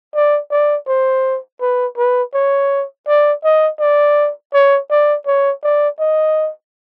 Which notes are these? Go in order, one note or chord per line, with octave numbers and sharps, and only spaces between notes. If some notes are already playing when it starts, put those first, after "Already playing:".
D5
D5
C5
B4
B4
C#5
D5
D#5
D5
C#5
D5
C#5
D5
D#5